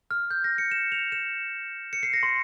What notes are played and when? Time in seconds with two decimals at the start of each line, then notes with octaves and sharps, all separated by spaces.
0.11 F6
0.31 G6
0.44 A#6
0.58 C#7
0.71 E7
0.92 F7
1.12 E7
1.93 C#7
2.03 C7
2.13 A#6
2.23 C6